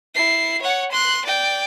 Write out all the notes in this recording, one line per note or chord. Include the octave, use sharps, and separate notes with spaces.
E4 C7
C#5 F#5
C6 F#6
D5 G5